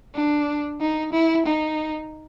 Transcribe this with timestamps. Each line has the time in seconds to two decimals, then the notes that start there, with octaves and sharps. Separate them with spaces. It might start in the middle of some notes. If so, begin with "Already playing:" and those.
0.15 D4
0.80 D#4
1.12 E4
1.45 D#4